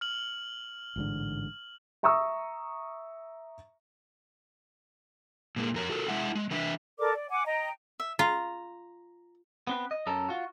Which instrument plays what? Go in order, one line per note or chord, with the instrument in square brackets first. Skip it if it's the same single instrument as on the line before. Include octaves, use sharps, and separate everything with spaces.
[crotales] F6 F#7
[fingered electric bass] A1 G#2 D3
[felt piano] E5 A#5 C#6 D#6 E6
[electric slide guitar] A#2 G#3 A#3
F2 A#4 C#5
F#4 A4 A#4
G#3 E4 E5 F#5
G#3
E3 D4 B4 E5
[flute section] A4 A#4 D5 D6
D5
F#5 G#5 D6
D#5 G5 A#5
[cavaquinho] E5
[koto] F4 [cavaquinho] A#5
[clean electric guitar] B3 C4 B4
D#5
F#2 C#4 A4 A#4
F4 F#4